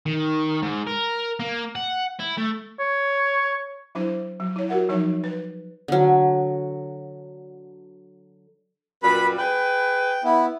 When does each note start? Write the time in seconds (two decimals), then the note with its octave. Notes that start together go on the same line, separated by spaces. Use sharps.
0.06 D#3
0.63 G#2
0.87 A#4
1.40 A#3
1.75 F#5
2.20 E4
2.38 A3
2.79 C#5
3.95 F#3 D4 E4 C5
4.40 F#3
4.56 E4 C#5
4.69 F#4 G4 A#4 E5 F#5
4.89 F3 F#3 D#4 C#5 E5
5.24 B4
5.88 D3 F#3
9.03 F#2 A#2 G3 B4 B5
9.38 G#4 B4 G5
10.24 B3 E4